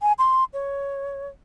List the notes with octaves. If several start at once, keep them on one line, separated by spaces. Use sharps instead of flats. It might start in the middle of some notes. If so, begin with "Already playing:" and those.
G#5
C6
C#5